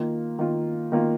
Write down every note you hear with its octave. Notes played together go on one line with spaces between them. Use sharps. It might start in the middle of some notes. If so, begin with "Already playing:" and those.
Already playing: D#3 A#3 F4
D#3 A#3 F4
D#3 A#3 F4